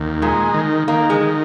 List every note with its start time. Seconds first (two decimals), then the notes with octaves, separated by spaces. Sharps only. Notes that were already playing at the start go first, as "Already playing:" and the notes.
Already playing: D#2
0.22 A#2 G#3
0.54 D#3
0.88 D#3 A#3
1.10 G#3
1.21 D#3